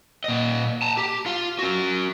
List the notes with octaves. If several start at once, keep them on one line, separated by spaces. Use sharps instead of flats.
A#2 D#5
A5 A#5
G4
F4 F5
C#4 F#4